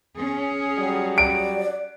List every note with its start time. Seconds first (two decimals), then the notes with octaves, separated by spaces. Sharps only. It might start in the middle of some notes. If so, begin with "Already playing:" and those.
0.16 C#4 G#4
0.78 F#3 G3
1.18 D5 D7